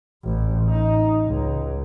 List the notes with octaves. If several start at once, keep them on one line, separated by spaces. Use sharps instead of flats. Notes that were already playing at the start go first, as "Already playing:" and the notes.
A1
D#4
C#2